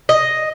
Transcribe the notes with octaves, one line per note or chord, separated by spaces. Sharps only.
D#5